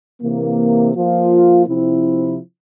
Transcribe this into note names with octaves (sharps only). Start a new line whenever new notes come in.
C3 E3 A#3
F3 A#3 F4
C3 F3 C4 E4